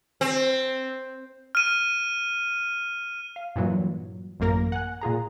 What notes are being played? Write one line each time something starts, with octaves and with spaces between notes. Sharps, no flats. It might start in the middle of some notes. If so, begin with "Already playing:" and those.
C4
F6 D#7
F5
G2 A#2 E3 F#3
A1 F#2 A#3 A#4 A#6
F#5 G#5 F#6
A#2 F4 G#4 A#5